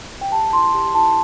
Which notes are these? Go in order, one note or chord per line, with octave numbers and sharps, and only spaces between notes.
G5
G4 A5
E4 C6
G4
E4 A5